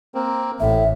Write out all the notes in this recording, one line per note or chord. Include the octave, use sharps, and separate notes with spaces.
A#3 C4
A1 A2 E5